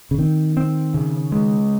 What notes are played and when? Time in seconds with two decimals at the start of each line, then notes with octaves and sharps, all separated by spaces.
0.11 C#3
0.19 D#3 C4
0.57 C4
0.94 C#3
1.32 G#3